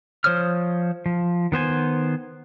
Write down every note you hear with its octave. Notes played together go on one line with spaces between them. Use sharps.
F3 C5 C#5 D#6 F6
F3
D#3 B3 C5 G#5